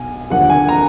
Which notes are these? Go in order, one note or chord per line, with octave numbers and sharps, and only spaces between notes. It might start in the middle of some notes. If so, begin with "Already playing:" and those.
Already playing: B1 B2 G#5
D#2 D3 F3 A#3 F#5
G#5
A#5